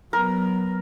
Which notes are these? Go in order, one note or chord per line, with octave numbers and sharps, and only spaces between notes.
F#3 B3 A#4